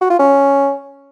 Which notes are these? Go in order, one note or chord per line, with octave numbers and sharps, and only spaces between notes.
F#4
F4
C#4